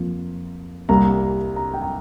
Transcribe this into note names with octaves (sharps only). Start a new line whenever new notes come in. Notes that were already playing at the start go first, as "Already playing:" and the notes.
Already playing: F2 F3 A#3
C2 C3 G3 A#3 A#5
A#5
G5
A#5